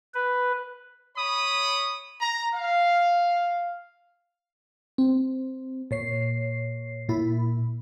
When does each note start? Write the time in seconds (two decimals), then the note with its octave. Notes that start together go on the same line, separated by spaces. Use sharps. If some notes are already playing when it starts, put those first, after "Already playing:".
0.15 B4
1.17 C#5 B5 D#6
2.21 A#5
2.55 F5
4.98 C4
5.91 A#2 C#5 C7
7.09 A#2 E4 B5